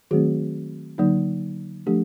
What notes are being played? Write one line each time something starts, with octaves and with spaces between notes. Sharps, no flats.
D#3 F#3 A3 C4 F#4 G#4
D3 F#3 A#3 D#4
F3 A3 D4 G4 A4